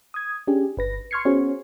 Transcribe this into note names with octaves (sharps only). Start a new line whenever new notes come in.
D#6 G#6
C#4 D4 G4 G#4
G1 B4 A#6
C6 C#6 F6 G#6 C7 C#7
B3 C#4 F#4 G#4 C5 C#5